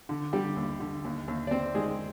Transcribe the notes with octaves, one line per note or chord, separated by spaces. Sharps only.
D3
D3 G3 G4
D#2
D3
D#2
D#2
D5
D#2 C4 C5
D#3 G#3 G#4